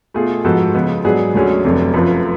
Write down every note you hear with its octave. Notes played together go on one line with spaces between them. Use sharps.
B2 A3 F4 G#4
G#2 F3 B3 F#4 A4
C#3 F3 G#3 B3
G#2 F#3 B3 D4 G#4
D2 D3 F#3 C#4 G#4
F1 F2 D3 F#3 A3
F#2 F3 A3 F4 B4